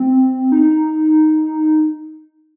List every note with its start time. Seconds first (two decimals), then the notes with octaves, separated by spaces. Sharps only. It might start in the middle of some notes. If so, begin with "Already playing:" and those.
Already playing: C4
0.52 D#4